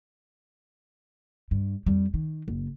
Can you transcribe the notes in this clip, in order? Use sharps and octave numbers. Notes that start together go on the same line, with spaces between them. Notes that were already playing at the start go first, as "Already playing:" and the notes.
G2
F2 G3
D#3
F#1